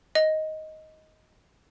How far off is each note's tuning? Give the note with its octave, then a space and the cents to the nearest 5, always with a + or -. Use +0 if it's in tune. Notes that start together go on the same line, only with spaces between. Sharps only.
D#5 +10